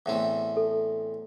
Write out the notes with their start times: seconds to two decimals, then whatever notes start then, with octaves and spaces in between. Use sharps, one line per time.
0.06 E2 A2 C4
0.57 A4